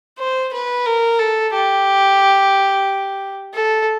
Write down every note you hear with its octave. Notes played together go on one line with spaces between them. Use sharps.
C5
B4
A#4
A4
G4
A4